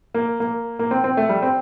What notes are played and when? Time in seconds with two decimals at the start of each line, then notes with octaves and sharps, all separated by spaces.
0.14 A#3
0.40 A#3
0.79 A#3
0.91 C4
1.04 C4
1.17 A3
1.29 G3
1.42 C4